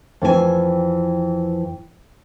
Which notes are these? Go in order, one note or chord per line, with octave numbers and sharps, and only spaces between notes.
F2 E3 F#4 G#5